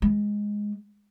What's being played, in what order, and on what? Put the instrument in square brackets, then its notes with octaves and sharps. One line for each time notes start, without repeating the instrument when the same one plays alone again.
[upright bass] G#3